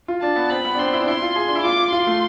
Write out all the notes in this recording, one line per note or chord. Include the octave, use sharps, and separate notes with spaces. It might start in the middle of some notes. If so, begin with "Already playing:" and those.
F4
D4 A5
B3
C4 B5
B3
D4
C4 C6
E4
D4
E4 C6
F4
G#4
D4
E4
F4 D6
F4 C6
A3